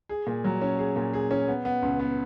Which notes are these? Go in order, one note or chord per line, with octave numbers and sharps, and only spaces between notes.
G#4
A#2
F#3
C#4
G#4
A#2
G#4
C#4
B3
B3
C#2
B3